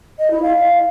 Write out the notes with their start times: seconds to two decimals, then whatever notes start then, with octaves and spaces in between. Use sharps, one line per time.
0.19 D#5
0.31 E4
0.42 F5